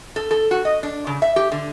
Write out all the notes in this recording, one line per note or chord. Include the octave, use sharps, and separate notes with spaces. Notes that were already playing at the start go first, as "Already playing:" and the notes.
A4
A4
F#4
D#5
D4
C#3
E5
G4
D3